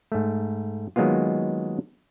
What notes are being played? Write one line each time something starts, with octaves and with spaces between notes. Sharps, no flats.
G#2 A3
D#3 F#3 G#3 A#3 B3 F4